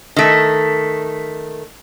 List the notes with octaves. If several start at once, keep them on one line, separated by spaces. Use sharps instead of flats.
D#3 A3